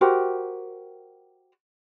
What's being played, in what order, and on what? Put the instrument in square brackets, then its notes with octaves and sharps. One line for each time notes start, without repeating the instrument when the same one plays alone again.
[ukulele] F#4 G4 A#4 C5